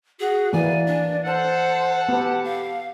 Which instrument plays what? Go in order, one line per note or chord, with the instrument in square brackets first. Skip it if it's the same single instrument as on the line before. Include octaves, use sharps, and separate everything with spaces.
[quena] F#4 [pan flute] G#4
[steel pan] E3 A#3 [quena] D5 [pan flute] G#5
[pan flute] D4
[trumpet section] A4 F#5 [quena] C5 [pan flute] A5
[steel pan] B3 [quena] G4
[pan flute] F5